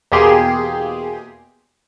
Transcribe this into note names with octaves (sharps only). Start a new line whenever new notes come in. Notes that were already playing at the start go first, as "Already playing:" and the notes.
E2 B2 A#3 G4 G#4 C6